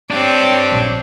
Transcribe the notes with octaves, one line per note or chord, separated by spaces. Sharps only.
C4 D4 G4 C#5 D5
A#1